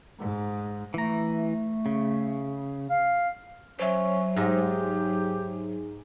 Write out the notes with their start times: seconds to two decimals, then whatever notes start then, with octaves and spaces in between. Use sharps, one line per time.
0.18 G#2
0.94 E3 A3 A#5
1.86 C#3
2.90 F5
3.79 F#3 C#4 C5 E5
4.36 G#2 G4